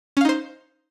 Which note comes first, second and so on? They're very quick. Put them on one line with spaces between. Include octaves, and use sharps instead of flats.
C#4 F5 D#4 C5